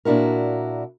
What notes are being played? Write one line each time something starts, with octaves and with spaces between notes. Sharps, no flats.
A#2 D4 E4 F#4 A#4